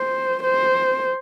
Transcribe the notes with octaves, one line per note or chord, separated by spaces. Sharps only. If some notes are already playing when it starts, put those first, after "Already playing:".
Already playing: C5
C5